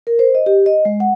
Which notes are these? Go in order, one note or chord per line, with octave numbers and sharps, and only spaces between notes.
A#4
C5
D#5
G4
D#5
G#3
F#5